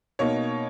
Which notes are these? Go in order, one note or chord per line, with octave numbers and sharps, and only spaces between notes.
B2 A#3 D#4 C#5